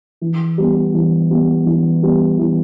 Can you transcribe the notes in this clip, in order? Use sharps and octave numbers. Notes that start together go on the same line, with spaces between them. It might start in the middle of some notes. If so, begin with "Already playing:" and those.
E3
G3 B3
E3
G3 B3
E3
G3 B3
E3